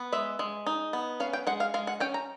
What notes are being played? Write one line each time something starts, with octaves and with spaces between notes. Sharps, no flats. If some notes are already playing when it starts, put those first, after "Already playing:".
Already playing: B3
G#3 E5
G#3
D#4
B3
C#4 F5
G5
G#3 F#5
F5
G#3 F5
F#5
C#4 G5
A#5